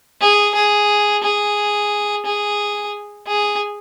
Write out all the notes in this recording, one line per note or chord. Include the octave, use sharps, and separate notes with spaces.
G#4
G#4
G#4
G#4
G#4